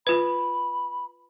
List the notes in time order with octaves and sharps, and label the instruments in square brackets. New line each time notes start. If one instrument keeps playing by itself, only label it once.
[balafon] F4 B4 [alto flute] B5